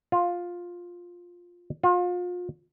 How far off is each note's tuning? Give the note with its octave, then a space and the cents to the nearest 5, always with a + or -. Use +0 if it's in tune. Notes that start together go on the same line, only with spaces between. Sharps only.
F4 +10
F4 +35